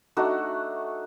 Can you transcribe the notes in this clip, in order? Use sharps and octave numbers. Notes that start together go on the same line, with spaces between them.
A3 D4 D#4 F#4